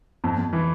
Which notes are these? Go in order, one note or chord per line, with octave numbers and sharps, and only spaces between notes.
F2
F2
E3